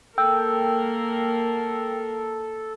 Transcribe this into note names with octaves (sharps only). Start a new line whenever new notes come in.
A#3 A4 A#4 G5 E6